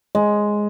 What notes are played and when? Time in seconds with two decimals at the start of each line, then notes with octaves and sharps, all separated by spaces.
0.15 G#3